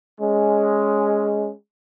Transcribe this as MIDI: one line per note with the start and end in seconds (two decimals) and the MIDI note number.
0.20 1.51 56
0.20 1.51 61